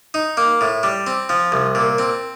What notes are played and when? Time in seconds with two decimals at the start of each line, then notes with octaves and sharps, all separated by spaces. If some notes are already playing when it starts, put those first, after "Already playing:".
0.14 D#4
0.37 A#3
0.61 A2
0.83 G3
1.07 C4
1.29 F3
1.52 C2
1.75 A#2
1.98 C4